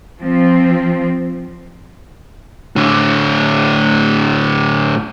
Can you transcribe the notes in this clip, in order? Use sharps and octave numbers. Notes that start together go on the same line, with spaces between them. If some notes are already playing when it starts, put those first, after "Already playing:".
F3 C4
A2 D3